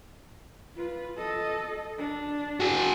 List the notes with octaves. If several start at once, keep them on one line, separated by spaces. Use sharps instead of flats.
F4 B4
A4 D#5
D4
F#4 G#4